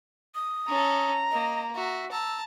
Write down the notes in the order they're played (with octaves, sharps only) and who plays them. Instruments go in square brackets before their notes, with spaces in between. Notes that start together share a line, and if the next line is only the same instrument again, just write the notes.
[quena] D#6
[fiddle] C#4 A4 [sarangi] A#5
[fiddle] A#3 [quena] D#5
[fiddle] F#4 [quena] E5
[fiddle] A5 A#5 [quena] E6